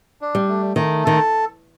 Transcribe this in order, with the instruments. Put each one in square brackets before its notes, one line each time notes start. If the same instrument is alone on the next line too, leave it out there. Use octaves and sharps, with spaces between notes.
[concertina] D4
[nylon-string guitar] G3
[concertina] A3
[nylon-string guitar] D#3 [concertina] A3
[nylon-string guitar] D#3 [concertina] A4